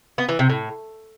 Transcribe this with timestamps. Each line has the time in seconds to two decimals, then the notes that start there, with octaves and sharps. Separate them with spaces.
0.18 B3
0.29 E3
0.39 C3
0.50 A2